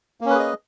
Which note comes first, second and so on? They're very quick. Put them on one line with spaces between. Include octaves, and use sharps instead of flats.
A#3 C#4 B4 G#4 D#5